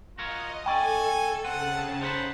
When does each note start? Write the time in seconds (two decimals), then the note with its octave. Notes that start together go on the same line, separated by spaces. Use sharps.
0.18 F4 F#4 A#4 C#5 D#5
0.66 C#2 A4 D5 G5 G#5 C#6
1.45 C#3 C4 F#5 A5 D#7
2.02 D#4 C5 F#5 B5